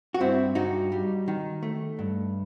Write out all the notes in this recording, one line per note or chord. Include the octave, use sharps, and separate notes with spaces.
F#4
G2 C4 E4
G2 D#4 F#4
G3
D#3
A3
G2